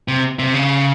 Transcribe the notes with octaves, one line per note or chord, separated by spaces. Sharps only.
C3
C3
C#3